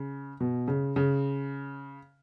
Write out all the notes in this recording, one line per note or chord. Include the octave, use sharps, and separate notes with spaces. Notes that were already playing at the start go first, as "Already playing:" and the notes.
Already playing: C#3
B2
C#3
C#3